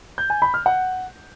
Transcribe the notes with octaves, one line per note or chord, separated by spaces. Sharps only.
G6
G#5
B5
F6
F#5